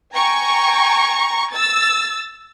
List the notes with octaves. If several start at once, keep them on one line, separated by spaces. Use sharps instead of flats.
G5 G#5 A#5 C#6
E6 A6